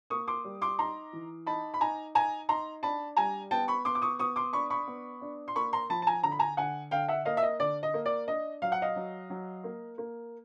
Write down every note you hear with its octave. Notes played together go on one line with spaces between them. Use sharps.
A#3 C#6 D#6
C6 D6
G3
C6 D6
D#4 A#5 C6
E3
D#4 A5 B5
B5
D#4 G#5 A#5
D#4 G#5 A#5
D#4 A#5 C6
D4 A5 B5
G3 G#5 A#5
B3 G5 A5
B5 C#6
B3 C6 D6
D6
C#6 D#6
B3 C#6 D#6
C6 D6
D4 B5 C#6
B5 C#6
B3
D4
C6
A#3 B5 C#6
A#5 C6
F3 A5 B5
A5
G#5 A#5
D3 A#5
B5
G#5 A#5
D3 F#5 G#5
D3 F5 G5
E5 F#5
A#3 D#5 F5
E5
D#5
D3 D5
D#5
A#3
D5
D4 D#5
F#3 F5
F#5
D#5 F5
F#3
F#3
A#3
A#3